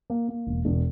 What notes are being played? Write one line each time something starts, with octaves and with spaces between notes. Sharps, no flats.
A#3
A#3
E1
E1